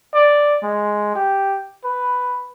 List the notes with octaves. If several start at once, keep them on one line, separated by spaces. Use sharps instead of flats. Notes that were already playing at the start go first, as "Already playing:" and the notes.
D5
G#3
G4
B4